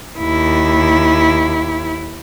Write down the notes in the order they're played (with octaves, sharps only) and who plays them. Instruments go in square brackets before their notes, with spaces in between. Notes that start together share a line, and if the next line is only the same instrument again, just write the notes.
[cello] D#2 E4